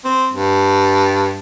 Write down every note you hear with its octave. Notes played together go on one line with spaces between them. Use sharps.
C4
G2